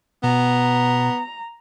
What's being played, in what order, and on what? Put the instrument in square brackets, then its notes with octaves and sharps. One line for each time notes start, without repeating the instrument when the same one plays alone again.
[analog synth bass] B2 [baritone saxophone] B3 [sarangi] A#5